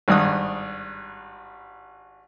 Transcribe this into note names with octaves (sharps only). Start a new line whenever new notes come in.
G#1 G2 D#6